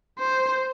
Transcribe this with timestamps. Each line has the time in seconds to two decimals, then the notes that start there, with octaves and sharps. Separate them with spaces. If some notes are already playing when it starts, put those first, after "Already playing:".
0.19 C5